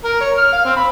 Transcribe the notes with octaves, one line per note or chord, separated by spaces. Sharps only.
A#4
C#5
F6
F5
C4
B5